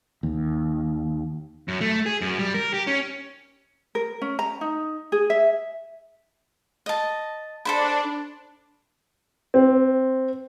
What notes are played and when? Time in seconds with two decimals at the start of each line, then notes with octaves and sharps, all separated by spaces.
0.23 D#2
1.68 F#2
1.81 A3
2.06 G#4
2.21 F#2
2.39 G3
2.54 A#4
2.74 G4
2.87 C#4
3.95 A#4
4.22 C#4
4.39 A#5
4.61 D#4
5.12 G#4
5.30 E5
6.86 D#5 A5
7.65 D4 A4 C5 B5
9.54 C4